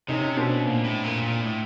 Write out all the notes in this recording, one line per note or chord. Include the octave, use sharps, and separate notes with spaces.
C3 C#4 D#4
B2 C4 D4
A#2
A2
A#2
A#2
A2